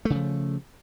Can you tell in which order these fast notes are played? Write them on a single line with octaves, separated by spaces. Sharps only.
A3 C#3 F3